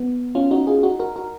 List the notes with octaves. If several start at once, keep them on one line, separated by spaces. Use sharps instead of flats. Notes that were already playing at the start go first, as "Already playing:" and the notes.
Already playing: B3
C#4 F4
D#4 F#4
F4 G#4
D#4 F#4
F#4 A#4
F#4 A#4